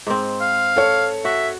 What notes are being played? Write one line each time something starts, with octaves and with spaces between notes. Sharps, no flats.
G#2 C4
F5
A4 C#5
F#4 E5